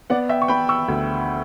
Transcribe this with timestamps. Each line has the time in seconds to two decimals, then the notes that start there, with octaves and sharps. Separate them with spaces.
0.10 B3 D5 F#5
0.29 E5 G5
0.42 C#6
0.48 B3 G5 B5
0.69 C#6 E6
0.88 D2